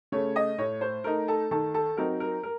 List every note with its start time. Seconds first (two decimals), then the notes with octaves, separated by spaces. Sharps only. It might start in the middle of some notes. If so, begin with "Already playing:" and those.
0.12 C#3 A3 C#5
0.36 D#5
0.58 A2 C#5
0.81 C5
1.04 A3 D#4 A#4
1.28 A4
1.51 D#3 A4
1.74 A4
1.97 F#3 C4 D#4 A#4
2.20 A#4
2.43 A#4